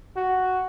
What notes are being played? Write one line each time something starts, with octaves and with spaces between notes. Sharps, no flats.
F#4